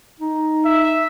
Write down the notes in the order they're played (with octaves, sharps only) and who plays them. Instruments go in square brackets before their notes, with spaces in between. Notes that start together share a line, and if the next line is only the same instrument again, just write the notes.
[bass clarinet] D#4
[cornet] E5